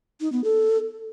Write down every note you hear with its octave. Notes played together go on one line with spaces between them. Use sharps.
D#4
B3
A4